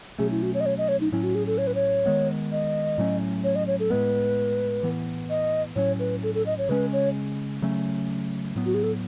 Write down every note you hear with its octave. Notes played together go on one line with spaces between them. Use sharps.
B2 F#3 A3 C#4 G#4
E4
F#4
C#5
D#5
C#5
D#5
C#5
D#4
A2 F#3 C#4 E4
F#4
G#4
A4
C#5
B4
C#5
D#3 G#3 B3
D#5
A2 F#3 A3 C#4
C#5
D#5
C#5
A4
A2 G#3 B3 B4
A2 E3 B3
D#5
A2 F#3 C#4 C#5
B4
A4
A4
D#5
C#5
C#3 G#3 C#4 B4
C#5
C#3 F#3 A3 C#4
A2 F#3 B3
F#4
G#4
A4